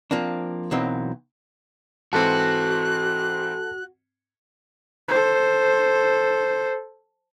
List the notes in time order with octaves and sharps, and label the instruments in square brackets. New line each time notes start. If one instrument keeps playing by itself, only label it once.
[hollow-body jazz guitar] F3 A#3 C4 D4
B1 E3 F#3 A#3 C4 D#5
[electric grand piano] G#2 E3 C4 [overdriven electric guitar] F#4 [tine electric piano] A4 A5 [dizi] F#6
[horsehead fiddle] A4 C5